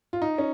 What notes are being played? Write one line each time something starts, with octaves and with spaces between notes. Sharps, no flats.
F4
D#4
C#4